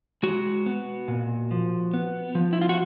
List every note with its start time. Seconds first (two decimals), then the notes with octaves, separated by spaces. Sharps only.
0.23 G#3 F#4
0.66 B3
1.08 A#2
1.51 F3
1.94 B3
2.35 F3
2.53 E4
2.61 F4
2.69 F#4